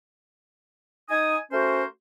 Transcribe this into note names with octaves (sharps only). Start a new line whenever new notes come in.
D#4 G#5 D#6
A3 C#4 F#4 A#4 C5